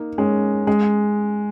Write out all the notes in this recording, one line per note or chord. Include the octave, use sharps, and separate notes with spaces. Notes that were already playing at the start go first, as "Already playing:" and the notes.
Already playing: A#3 D#4
G#3 C#4
G#3